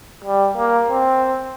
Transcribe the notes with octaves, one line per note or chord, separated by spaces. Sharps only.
G3
A#3
C4